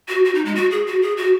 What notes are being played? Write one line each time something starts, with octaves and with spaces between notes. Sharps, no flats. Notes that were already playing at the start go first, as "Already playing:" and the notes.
F#4
F#4
D#4
G#3
F#4
G#4
F#4
G#4
F#4